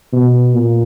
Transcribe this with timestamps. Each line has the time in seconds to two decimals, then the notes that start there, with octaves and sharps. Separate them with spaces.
0.13 B2
0.55 A#2